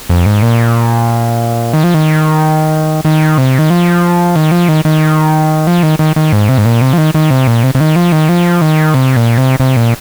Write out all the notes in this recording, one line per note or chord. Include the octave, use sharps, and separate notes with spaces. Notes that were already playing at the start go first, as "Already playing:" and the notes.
F2
G#2
A#2
D#3
F3
D#3
D#3
C3
D#3
F3
D#3
F3
D#3
D#3
F3
D#3
D#3
D#3
G#2
C3
G#2
A#2
C3
F3
D#3
D#3
C3
A#2
C3
C3
D#3
F3
D#3
F3
D#3
C3
A#2
C3
C3
A#2